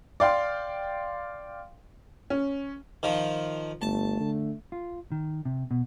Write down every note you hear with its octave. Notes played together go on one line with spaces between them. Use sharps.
D5 F5 G5 C6
C#4
D#3 F3
G1 A3 A5
D3
F4
D#3
C3
B2